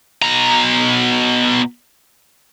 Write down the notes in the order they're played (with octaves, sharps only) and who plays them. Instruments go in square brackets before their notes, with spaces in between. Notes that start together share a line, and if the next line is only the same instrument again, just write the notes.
[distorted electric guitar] B2 A#5